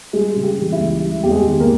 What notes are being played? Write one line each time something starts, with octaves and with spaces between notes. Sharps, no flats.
G3 G#3 G#4
C#3
G4
E3
E4
C#2
G3
E2 G4
G#3 G#4
D#3
A#3 A#4